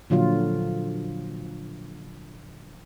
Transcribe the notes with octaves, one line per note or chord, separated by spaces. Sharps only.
A#2 D3 F3 F#3 F4